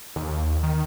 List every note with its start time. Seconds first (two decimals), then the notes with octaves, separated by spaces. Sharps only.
0.16 D#2
0.63 D#3